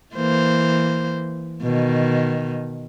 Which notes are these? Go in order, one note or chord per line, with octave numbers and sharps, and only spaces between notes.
E3 A#3 C5
B2 D#3